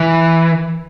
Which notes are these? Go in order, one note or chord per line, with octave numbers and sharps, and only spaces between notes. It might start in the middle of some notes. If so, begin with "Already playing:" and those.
Already playing: E3